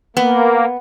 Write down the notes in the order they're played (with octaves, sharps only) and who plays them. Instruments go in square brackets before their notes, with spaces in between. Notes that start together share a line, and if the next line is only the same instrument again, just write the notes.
[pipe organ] A#3 [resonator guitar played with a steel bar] B3